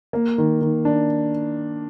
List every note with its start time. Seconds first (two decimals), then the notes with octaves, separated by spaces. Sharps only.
0.13 A#3
0.38 D#3
0.61 D#3
0.85 D4